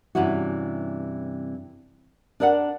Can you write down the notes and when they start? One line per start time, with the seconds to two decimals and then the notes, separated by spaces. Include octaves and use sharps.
0.15 G2 C3 E3 C#4 E4 F#4
2.40 D4 A#4 D5 D#5 F#5